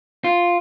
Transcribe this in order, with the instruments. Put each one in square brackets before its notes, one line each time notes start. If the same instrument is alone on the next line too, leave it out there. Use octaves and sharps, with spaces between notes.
[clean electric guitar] F4